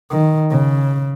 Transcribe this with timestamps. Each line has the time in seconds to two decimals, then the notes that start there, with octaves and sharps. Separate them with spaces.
0.11 D#3
0.50 C#3